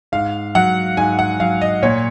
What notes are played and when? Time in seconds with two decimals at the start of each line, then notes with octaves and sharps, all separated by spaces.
0.12 G#2 F5
0.55 F#3 F#5
0.97 G#2 G#5
1.19 F#5
1.40 F#3 F5
1.61 D#5
1.82 A#2 C#5